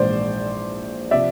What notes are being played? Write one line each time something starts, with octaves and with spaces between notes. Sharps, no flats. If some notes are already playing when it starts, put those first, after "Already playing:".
Already playing: A#1 G#2 E3 C5 D5
C3 F3 D5 E5